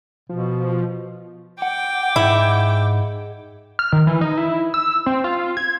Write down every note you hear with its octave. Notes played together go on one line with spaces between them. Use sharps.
B2 F3
F#5 G5 D6
G#2 E4 G#4 D#5 F#5
F6
D#3
E3
D#4
E4
E6
C4
F4
G#6